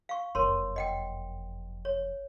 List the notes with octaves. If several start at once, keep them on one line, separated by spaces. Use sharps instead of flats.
F5 C#6
F#1 F2 A#4 C#5 C6
D#5 F#5 G5
C#5